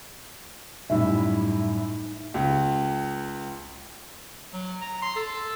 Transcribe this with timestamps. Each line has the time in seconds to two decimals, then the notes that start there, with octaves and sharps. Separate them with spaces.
0.90 F#2 A2 G3 D#4 E4 E5
2.34 C#2
4.53 F#3
4.81 A#5
5.02 C6
5.16 A4